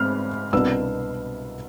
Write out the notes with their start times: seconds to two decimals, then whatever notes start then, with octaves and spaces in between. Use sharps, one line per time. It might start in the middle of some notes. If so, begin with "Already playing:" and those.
Already playing: G#2 C4 F6
0.53 C2 B2 B3 D4 E6